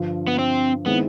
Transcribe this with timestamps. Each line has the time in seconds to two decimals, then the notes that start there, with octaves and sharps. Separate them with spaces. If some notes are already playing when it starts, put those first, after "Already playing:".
Already playing: G2 D3 F3
0.27 B3
0.39 C4
0.86 D#3 G#3 B3 C4 E4